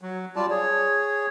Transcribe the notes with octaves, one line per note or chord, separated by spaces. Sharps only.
F#3
G3 F4 D5 A5
G#4 C#5